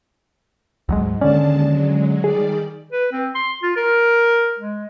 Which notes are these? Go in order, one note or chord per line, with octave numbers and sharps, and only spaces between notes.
D2 G#2 F#3 G#3
D#2 D3 G#3 C#4 D5 A5
F#3 G#3
D#3 G3 G#4 D5
B4
C4
C6
F4
A#4
G#3